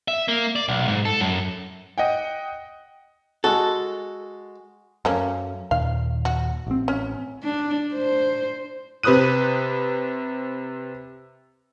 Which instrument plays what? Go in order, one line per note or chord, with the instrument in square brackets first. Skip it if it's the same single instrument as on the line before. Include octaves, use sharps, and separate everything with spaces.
[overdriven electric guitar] E5
A#3
D5
B1
G#2
A4
F#2
[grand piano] D#5 F#5 G5
[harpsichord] G#3 F#4 [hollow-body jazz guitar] A4
[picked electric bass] F#2 [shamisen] A3 A#3 C#4
[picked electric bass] D#2 A#2 D#3 [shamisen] F5
[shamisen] F#4
[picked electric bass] A1 C4
[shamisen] C#4
[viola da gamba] D4
C5
[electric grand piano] C3 B4 C5 D#6 F#6 D#7